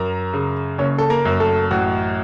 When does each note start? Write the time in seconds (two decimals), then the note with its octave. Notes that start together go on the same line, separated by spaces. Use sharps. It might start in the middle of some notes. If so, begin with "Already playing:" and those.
Already playing: F#2 A#4 A#5
0.33 C#3
0.78 F#1 C#4 C#5
0.98 A4
1.10 A#3 A#4
1.25 F#2
1.40 A3 A4
1.71 A1 F#4